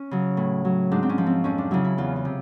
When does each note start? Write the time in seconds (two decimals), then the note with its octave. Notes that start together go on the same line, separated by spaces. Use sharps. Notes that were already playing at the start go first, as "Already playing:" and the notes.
Already playing: C#4
0.11 C#3 F#3
0.37 A2
0.65 F#3
0.91 G#2 D4
1.03 C4
1.09 C#4
1.18 F3
1.26 C4
1.44 F2 C#4
1.58 D4
1.71 C#3 F#3 E4
1.84 E4
1.98 E2 F4
2.16 F4
2.25 C3